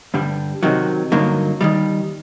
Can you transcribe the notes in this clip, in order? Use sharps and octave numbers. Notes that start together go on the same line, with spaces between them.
G2 D3 G3
C3 D#3 F#3
G2 D3 F#3 A#3 D#4
D#2 D#3 G3